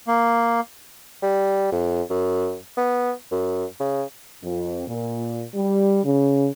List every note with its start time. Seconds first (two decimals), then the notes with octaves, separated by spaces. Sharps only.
0.07 A#3
1.23 G3
1.72 F2
2.10 F#2
2.77 B3
3.32 F#2
3.80 C#3
4.43 F2
4.88 A#2
5.55 G3
6.04 C#3